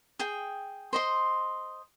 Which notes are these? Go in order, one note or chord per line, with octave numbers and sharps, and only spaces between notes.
G#4 G5
C5 D#5 C6